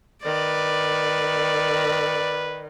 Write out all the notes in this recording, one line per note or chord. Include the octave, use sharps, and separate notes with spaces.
D#3 B4 D5